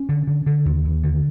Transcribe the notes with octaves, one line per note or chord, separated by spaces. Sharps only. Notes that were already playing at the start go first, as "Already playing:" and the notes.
Already playing: C#4
D3
D3
D3
D#2
D#2
D3